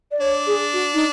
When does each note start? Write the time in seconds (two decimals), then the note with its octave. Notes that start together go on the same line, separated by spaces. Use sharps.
0.11 D5
0.20 D4 C#5
0.47 G#4
0.73 F#4
0.94 D#4